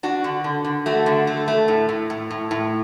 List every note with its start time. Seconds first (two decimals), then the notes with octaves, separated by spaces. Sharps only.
0.03 D4 F#4
0.24 D3
0.44 D3
0.65 D3
0.86 A3 F#4
1.06 D3
1.27 A3
1.48 A3
1.68 A2
1.89 A2
2.10 A2
2.31 A2
2.51 A2